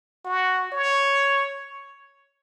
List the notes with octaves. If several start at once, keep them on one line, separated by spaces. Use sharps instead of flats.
F#4
C#5